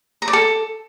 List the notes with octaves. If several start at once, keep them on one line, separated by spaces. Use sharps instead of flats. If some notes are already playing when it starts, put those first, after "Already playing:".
A#5
D5
A4